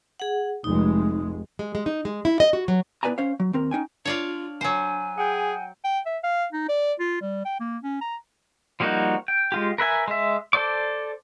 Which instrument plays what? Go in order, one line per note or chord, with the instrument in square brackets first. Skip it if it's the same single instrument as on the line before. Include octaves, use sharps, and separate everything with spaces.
[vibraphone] G#4 F#5
[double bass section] F1 G#3 [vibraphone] D#4
[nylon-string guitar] G#3
G#3
D#4
G#3
E4
D#5
F#4
F#3
[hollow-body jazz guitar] B3 E4 B4 D5 G#5 A#5
C#4 C5 C#5 F5
F#3
D#2 C4 A#4
C#4 D#4 G5 G#5
[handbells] D4 [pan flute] F4 [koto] C#5 D5 F5
[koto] F#3 C5 [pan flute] G#5
[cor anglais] G#4 [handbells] F#5 G5 G6
[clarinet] G5
E5
F5
D#4
D5
F4
G3
G5
A#3
C#4
A#5
[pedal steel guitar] F3 G3 A#3 D#4 F#4
G5
G#3 F4 G4
A#4 B4 E5 G#5
G#3 E5
A4 C5 D5 D6